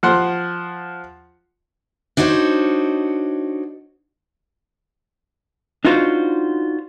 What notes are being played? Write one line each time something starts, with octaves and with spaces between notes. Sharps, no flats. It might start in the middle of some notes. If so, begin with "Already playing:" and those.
F3 F#5 C6
D4 D#4 F#4 C5 C#5
D4 D#4 F4 F#4 B4 C5